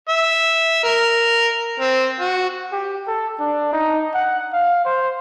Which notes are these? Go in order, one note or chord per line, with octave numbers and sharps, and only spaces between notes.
E5
A#4
C4
F#4
G4
A4
D4
D#4
F#5
F5
C5